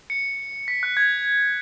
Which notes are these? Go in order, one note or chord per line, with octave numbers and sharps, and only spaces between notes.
C#7
B6
F#6
G#6